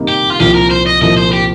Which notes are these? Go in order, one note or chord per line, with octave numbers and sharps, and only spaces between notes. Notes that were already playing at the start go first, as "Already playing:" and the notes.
Already playing: C3 G3 A#3 D#4
G4
F4
C2 A#2 F3 G4
A#4
C5
D#5
C2 A#2 F3 D#5
C5
G4